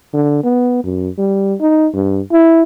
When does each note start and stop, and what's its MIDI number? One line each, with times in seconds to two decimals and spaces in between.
0.14 0.40 50
0.43 0.81 59
0.84 1.09 42
1.18 1.54 55
1.60 1.87 63
1.94 2.21 43
2.32 2.63 64